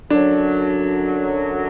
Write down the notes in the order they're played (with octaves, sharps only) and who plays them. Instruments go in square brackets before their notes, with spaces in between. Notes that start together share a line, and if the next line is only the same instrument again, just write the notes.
[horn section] F#2 D3 F#3 [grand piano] D4